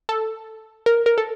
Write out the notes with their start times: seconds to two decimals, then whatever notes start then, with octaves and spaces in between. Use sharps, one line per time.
0.09 A4
0.86 A#4
1.06 A#4
1.18 A4